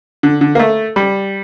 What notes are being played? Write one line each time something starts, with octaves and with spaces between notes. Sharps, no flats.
D3
D3
A#3
A3
G3